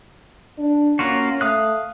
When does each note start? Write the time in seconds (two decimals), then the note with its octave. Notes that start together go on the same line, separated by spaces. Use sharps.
0.58 D4
0.99 A#3 C#4 F4 F#4
1.41 A3 F5 D#6 F#6